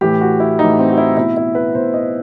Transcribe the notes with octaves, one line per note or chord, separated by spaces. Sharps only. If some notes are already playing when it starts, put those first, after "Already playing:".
A2 E3 G4
F#4
E4
A2 E3 D#4
C4
F#4
E4
B2 E4
E4
B4
B2 C5
D#5